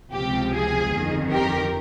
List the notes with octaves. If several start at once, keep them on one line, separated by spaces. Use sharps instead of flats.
C#2 C3 F3 G4
G#4
G1 F2 D#3
G4 A#4